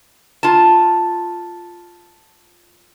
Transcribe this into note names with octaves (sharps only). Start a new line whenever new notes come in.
F4 A5